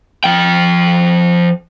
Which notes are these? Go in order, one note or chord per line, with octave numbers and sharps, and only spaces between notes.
F3 G5